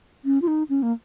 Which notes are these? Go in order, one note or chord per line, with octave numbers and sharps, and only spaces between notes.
C#4
F4
D#4
C#4
A#3